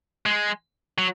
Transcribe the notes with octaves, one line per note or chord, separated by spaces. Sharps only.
G#3
F#3